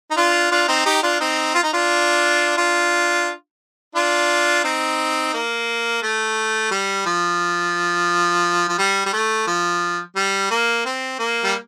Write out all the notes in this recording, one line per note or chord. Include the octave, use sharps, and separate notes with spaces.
D#4
D4 F4
D4 F4
C4 D#4
D#4 G4
D4 F4
C4 D#4
F4
D#4
D4 F4
D4 F4
D4 F4
C4 D#4
A#3
A3
G3
F3
F3
G3
G3
A3
F3
G3
A#3
C4
A#3
G3